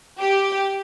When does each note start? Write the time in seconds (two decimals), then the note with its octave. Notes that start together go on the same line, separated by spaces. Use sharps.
0.19 G4